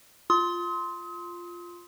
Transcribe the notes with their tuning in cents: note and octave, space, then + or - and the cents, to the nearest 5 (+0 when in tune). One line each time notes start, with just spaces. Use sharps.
F4 +0 C6 +0 D#6 +40